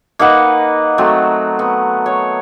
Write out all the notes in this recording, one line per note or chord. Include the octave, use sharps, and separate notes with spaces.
A#3 D#4 B4 F#5
F#3 A3 C4
B3
C#5